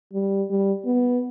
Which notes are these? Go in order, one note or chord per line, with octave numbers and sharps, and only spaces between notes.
G3
G3
B3